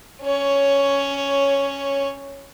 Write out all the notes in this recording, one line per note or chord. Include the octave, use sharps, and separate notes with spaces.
C#4 C#5